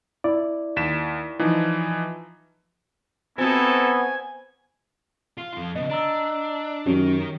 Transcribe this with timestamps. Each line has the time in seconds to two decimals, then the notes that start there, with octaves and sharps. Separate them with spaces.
0.24 E4 D5
0.76 D#2 B6 E7
1.39 E3 F3 D#4
3.38 B3 C4 D#4 E4 F#4 A4 C5 G#5
5.38 F4
5.54 F2 F4
5.75 C#3 B3 D#5
5.89 D4 D#5 A#5 E6
6.86 F#2 D#3 G4 C#5